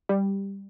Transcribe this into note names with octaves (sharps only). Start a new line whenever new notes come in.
G3